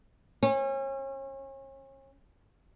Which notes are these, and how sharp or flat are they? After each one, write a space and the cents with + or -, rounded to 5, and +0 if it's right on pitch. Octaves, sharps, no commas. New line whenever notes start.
C#4 -35